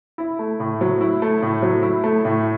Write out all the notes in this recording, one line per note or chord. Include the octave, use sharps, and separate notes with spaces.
E4
A3
A2
F#3
E4
A3
A2
F#3
E4
A3
A2